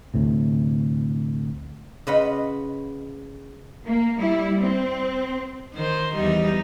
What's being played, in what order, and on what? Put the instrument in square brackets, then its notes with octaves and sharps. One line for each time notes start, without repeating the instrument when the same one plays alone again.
[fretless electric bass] D2 A2 C3
[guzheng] C#3 F4 B4 D#5 F#5 B5
[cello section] A#3
G3 E4
C4
[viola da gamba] D#3 C5
E2 G3 D#4